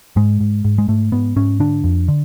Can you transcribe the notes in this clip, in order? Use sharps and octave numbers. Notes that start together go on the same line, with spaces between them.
G#2 G#3
G#2
G#2
G#3
G#2 A3
G#2 B3
G#2 C#4
D3 D4
F2
D3